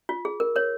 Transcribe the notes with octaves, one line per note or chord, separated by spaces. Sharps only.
F4
G#4
A#4
A#4 C#5